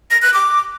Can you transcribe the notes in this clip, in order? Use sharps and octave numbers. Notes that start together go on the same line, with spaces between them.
A#6
F#6
D6